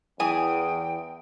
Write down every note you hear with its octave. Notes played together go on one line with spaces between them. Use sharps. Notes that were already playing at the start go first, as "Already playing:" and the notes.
E2 E3 G#4 G5 G#5 D#6